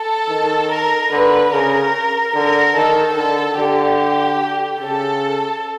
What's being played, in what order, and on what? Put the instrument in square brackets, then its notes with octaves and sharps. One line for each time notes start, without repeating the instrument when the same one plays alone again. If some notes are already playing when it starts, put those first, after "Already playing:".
Already playing: [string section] A4
[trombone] D#3
[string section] A#4
[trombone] D3 [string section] B4
[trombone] C#3 [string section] A#4
[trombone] D3 [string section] A#4
[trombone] D#3 [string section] A4
[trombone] D3 [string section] A4
[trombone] D3 [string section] G4
[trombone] C#3 [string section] A4